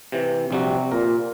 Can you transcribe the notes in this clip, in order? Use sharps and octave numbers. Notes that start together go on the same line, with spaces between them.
C3 E3
A#1 C3 G3 F#4
A#2 A#4